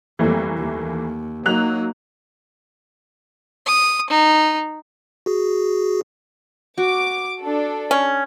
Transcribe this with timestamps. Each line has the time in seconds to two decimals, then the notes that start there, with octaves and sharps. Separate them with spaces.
0.19 F2 E3 G3 A3 A#3
0.57 D#2
1.46 F#3 A#3 D#4 F#6 F7
3.66 D#6
4.10 D#4
5.26 F#4 G#4
6.78 F#4 D6
7.42 D4 A4
7.91 C#4